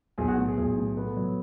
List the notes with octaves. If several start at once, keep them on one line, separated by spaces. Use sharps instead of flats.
B1 G#4 G#5
F#4 F#5
A2
G#4
B1
A2
B3 A4
F#3